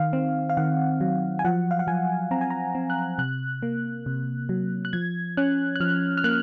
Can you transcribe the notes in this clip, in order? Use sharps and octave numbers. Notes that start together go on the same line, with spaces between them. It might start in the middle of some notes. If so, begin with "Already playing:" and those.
Already playing: D#3 F5
C4
F5
D#3 F#5
F#3
G#5
F3 F#5
F5
F#5
F3 G#5
C4 A#5
G#5
A#5
C4
F#6
C3 F#6
A#3
C3
F#3
F#6
F3 G#6
C#4 F#6
F#6
F3 F6
F6
A#3 F#6